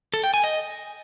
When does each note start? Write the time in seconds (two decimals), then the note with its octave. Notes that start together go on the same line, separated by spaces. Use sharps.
0.14 A4
0.24 G5
0.34 G#5
0.44 D#5